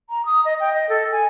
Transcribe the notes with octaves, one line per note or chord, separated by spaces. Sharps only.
A#5
D#6
D#5
G5
D#5
A4
G#5